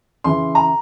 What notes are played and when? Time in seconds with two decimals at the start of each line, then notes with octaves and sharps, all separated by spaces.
0.24 C#3 E3 C6
0.55 A#5